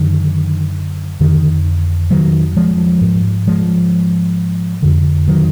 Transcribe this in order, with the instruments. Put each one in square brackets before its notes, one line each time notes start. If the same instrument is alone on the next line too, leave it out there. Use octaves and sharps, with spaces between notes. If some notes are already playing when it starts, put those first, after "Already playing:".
Already playing: [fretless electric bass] F#2 D3 D#3
F2 D3 D#3
D#3 F#3
F3 G#3
G#2
F3 G#3
F2 D3
D#3 F#3